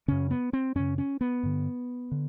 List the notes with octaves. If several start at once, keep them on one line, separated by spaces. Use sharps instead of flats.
F#2 C#3 C#4
B3
C4
F#2 C#3 C#4
C#4
B3
G2 D3
D3